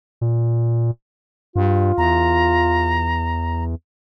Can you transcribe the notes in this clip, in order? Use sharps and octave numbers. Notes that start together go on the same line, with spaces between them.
A#2
G2 F4
E2 A#5